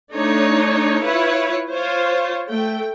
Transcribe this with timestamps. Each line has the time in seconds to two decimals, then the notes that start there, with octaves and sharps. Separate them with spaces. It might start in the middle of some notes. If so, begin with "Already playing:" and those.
0.13 A3 D4 D#4 C#5
1.04 E4 F4 B4 C#5
1.71 F4 C5 C#5
2.48 A3 G5